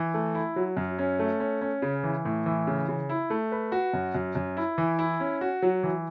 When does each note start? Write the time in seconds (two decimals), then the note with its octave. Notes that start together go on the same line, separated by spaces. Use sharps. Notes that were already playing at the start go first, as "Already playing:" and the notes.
Already playing: E3
0.14 A3
0.35 E4
0.56 F#3
0.77 F#2
0.99 C#4
1.19 A3
1.40 C#4
1.61 C#4
1.82 C#3
2.04 E3
2.25 A2
2.46 E3
2.67 C#3
2.88 C#3
3.09 E4
3.30 A3
3.52 B4
3.72 F#4
3.94 F#2
4.15 F#2
4.35 F#2
4.57 E4
4.78 E3
4.99 E4
5.20 C#4
5.41 F#4
5.62 F#3
5.83 E3